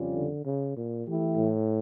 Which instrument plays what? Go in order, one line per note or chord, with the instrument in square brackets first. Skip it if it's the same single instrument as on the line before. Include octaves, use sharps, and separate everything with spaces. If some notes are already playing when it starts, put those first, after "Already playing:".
Already playing: [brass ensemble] F2 C#3 G3 C#4 F4
[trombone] D3
C#3
A#2
[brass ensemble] E3 A3 E4 G4
[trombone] A2